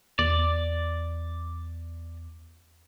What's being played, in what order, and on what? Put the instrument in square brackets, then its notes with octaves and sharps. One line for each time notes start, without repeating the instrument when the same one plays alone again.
[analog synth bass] E2 [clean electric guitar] D5